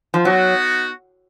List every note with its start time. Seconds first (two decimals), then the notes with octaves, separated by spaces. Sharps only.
0.14 F3
0.25 F#3 B3 D#4 F#4